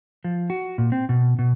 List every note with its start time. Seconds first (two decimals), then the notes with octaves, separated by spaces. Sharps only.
0.24 F3
0.50 F#4
0.78 A#2
0.92 C4
1.09 B2
1.39 B2